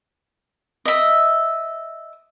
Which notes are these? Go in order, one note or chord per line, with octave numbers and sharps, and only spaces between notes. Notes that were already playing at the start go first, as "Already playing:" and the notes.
D#5 E5